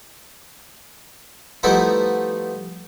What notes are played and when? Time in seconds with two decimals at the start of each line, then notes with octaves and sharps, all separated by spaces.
1.63 F3 G3 A3 B3 D#4 E4